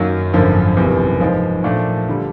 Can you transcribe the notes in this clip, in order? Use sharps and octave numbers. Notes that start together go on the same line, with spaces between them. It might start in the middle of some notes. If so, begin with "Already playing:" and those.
Already playing: F#2 D#3 F#3 A#3
G#1 F#2 D3 F3 A#3
F#1 E2 C3
G#2 F3 G#3
A#2 F3 A3 D4
D3 G3